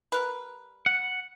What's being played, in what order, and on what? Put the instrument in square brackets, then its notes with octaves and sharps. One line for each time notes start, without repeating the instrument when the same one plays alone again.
[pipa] G3 A#4 B4
[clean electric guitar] F#5